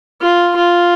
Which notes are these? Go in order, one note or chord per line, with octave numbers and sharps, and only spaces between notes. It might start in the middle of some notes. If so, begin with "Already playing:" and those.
F4
F4